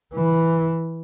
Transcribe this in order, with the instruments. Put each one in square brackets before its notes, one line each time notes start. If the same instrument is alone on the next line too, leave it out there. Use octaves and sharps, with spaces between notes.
[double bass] E3